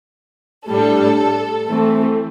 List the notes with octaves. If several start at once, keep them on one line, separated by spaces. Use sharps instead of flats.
A2 G3 D4 A4
E3 A3 C4